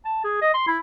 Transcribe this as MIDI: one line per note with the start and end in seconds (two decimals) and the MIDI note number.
0.05 0.24 81
0.24 0.38 68
0.42 0.49 75
0.54 0.66 84
0.67 0.78 64